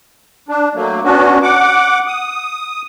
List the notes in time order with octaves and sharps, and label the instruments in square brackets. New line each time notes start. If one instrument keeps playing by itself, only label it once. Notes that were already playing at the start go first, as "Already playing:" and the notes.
[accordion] D4
F#3 A3 A#3
B3 C#4 D4 F#4
F#5 D6
D#6